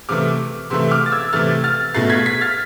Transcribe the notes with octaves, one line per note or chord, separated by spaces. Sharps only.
C3 E3 A3 D6 F6
C3 E3 A3 C6 E6
D6 F6
A6
E6 G#6
C3 E3 A3 F6 A6
F6 A6
B2 A3 A6 C7
G#6 B6
G#6 B6
F6 A6